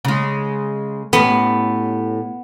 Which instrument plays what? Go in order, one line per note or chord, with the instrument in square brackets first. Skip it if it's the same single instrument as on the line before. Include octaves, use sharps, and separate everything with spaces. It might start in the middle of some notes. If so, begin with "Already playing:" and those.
[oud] C#3 G#3
[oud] A2 C#4 G4 [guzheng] B3